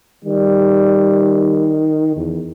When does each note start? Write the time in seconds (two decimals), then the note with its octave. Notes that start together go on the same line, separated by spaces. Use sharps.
0.25 D#3 G3
2.16 E2